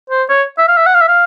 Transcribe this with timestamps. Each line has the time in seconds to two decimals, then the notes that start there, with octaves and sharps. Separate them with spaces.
0.10 C5
0.29 C#5
0.58 E5
0.68 F5
0.77 E5
0.87 F#5
0.94 F5
1.02 E5
1.09 F5